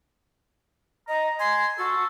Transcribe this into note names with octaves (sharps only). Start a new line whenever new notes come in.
D#5 A#5
G#5 C6
F#4 A4